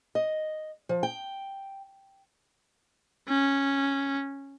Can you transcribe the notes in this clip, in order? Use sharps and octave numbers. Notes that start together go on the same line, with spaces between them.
D#5
F3
G5
C#4